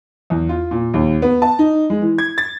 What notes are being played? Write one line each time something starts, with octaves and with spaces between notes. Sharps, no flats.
E2
F4
A#2
D#2
B3
A5
D#4
G#3
E3
G#6
A6